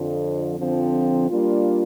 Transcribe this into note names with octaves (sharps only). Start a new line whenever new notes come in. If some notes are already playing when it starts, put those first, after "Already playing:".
Already playing: F2 D3 F3
F2 D3 F3 C4
G3 A#3 D4 F4